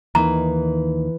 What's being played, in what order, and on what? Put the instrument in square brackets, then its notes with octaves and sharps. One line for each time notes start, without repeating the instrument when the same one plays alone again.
[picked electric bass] D#2 D#3 [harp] E3 [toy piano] A#5